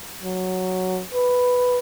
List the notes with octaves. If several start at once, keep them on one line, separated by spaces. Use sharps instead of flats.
F#3
B4